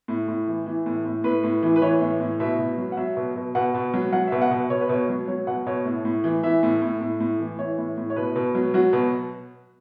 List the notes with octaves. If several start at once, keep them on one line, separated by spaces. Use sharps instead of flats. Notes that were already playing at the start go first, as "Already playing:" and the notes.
A2
A2
E3
E3
A2
A2
A2 B4
A2
E3
B4
E3 C#5
A2
A2
B2 E5
B2
F#3
F#5
F#3 E5
B2
B2
B2 F#5
B2
F#3
F#3 F#5
B2 E5
F#5
B2
B2 C#5
B4
B2 C#5
F#3
F#3 C#5
B2 F#5
B2 C#5
A2
A2
E3
E3 E5
A2
A2
A2
A2
E3
E3 C#5
A2
A2
C#5
B2 B4
B2
F#3
F#3 F#4
B2